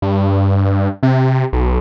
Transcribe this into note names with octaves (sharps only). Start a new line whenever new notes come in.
G2
C3
B1